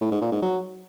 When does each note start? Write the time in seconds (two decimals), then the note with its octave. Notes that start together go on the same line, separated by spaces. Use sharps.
0.01 A2
0.11 G#2
0.21 A#2
0.32 G#2
0.42 F#3